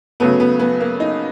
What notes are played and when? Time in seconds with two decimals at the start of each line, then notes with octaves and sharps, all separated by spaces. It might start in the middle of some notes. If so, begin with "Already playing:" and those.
0.20 C#3 F#3 A3 B3
0.40 B3
0.60 B3
0.80 A#3
1.00 D#4